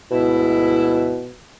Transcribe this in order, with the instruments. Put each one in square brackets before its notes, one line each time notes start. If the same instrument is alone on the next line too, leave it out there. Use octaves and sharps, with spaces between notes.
[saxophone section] D2 G#2 E4 [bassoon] B2